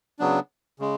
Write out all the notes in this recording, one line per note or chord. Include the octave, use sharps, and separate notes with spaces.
C#3 F#3 B3 D4
C#3 G#3